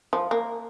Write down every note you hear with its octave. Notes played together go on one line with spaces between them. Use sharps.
F3
A#3